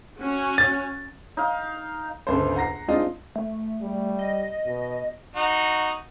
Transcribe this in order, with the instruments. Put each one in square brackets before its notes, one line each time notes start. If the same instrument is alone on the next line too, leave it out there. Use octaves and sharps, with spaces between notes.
[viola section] C#4 F#4
[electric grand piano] A6
[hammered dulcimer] D#4 F5
[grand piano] G1 C#2 A4 C5
F#5 A#5 A#6 C7
G#3 C4 D4 D#4 F4 D#5
[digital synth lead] A3
[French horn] G3
[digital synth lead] D#5
[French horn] B2
[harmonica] D#4 F#4